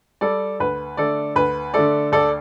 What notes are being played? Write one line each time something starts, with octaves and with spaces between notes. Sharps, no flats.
G3 A4 D5
D2 B4
D3 A3 A4 D5
D2 B4
D3 A3 A4 D5
D2 A4 D5